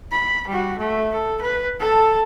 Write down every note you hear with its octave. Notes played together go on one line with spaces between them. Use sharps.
B5
G3 F#4
A3
A4
B4
A4 A5